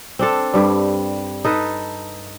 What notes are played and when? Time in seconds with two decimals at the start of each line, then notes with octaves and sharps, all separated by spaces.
0.19 C4 D4 A4
0.54 G2 G3
1.44 D#4 A4 B4